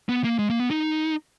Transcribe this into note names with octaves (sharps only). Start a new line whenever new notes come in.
B3
A#3
G#3
A#3
B3
D#4